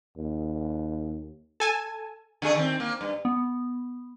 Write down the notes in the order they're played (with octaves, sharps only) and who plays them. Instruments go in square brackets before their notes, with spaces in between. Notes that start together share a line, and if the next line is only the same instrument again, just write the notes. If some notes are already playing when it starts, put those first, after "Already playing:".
[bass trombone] D#2
[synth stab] A4 G#5 A5
[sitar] D3 A3 G#4
D#3 C4
A#3
G2
[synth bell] B3